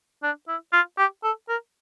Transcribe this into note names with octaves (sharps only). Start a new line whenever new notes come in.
D4
E4
F4
G4
A4
A#4